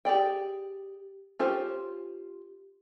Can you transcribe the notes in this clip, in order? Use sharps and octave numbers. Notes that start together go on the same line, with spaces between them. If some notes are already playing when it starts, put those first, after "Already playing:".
G4 G#4 D5 G5
C#4 F4 G4 C5